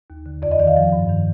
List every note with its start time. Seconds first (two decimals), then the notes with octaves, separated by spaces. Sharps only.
0.10 D#2
0.26 D3
0.42 F2 D5
0.51 D#5
0.59 D#3 D5
0.67 F5
0.76 F3
0.92 G2
1.09 D#3